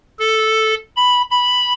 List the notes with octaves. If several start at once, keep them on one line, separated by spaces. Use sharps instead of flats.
A4
B5
B5